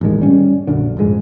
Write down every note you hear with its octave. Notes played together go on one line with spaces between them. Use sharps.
A1 A2 D#3 G#3
G1 G3 C#4
A#1 F#2 D3
D#1 F2 G#2 G#3